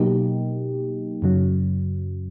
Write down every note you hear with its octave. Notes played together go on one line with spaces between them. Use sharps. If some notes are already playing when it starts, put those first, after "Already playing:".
Already playing: B2 F#3 A#3 D#4 G4
F#2 C#3 F#3